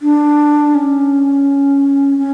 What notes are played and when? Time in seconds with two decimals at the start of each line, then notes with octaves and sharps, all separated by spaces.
0.02 D4
0.75 C#4
2.18 C#4